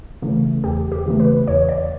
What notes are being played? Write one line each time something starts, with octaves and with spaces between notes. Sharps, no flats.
C#3 E3 A3
E2 G4
G4
C#3 E3 A3
B4
E2 C#5
D5